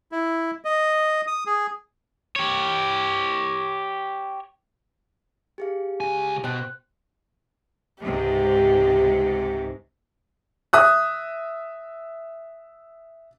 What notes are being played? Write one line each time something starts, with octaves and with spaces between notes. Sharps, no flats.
E4
D#5
D#6
G#4
G4 C#5
G4 G#4 F5
C#2 G#5
B2 C5 G5 F#6
C#2 G#2 C3 G4
E5 D#6 F#6